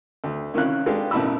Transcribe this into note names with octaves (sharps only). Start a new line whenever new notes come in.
D2
C2 D#3 C#4 E4 F5 F#6
G#3 D4 G4 A4 B4 F5
B1 F#2 A2 B5 E6